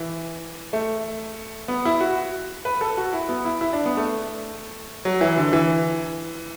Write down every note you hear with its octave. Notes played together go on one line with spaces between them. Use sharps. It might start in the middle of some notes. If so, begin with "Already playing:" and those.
Already playing: E3
A3
B3
E4
F#4
B4
A4
F#4
E4
B3
E4
E4
D4
B3
A3
F#3
E3
D3
E3